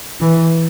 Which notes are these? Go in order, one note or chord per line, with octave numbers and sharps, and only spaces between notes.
E3